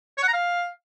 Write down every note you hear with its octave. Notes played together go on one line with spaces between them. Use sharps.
C#5
F#5
A#5
F5